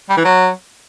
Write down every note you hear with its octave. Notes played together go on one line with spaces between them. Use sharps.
G3
E3
F#3